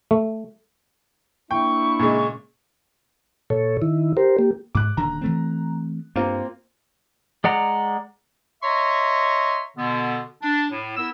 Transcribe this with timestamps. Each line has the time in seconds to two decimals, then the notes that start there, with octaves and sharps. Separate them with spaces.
0.11 A3
1.51 A#3 D4 E4 G5 C#6
1.99 A#2 C#3 G#3
3.50 A#2 A4 C#5
3.82 D#3 E4
4.17 G4 A#4 C5
4.39 A#3 G4
4.75 G#2 D6 F#6
4.97 D#1 D3 A#5
5.21 E3 A3 C4
6.16 G2 A#3 C4 F4
7.44 G#3 D5 F#5 A#5
8.63 C#5 D#5 E5 A#5 C6 C#6
9.77 B2 D3 B3
10.42 D4
10.71 A2
10.97 B3 E4 A#4 E6